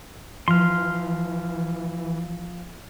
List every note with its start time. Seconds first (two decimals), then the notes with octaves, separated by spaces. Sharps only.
0.48 E3 F3 C6 F6